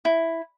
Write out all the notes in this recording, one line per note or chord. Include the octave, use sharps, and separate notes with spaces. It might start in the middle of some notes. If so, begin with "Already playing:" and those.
E4